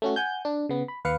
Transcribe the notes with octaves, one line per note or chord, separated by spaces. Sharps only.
A3 C#4 F#4
F#5 G#5 G6
D4
C#3 B3
B5
D#2 B4 F5 C#7